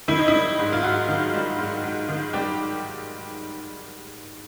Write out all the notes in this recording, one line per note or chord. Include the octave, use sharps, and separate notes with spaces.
D#3 E4
D#4
E4
G3
G#2
F4
G#2 F#4
D#3
G3
G#2
G#2
D#3
G3 G4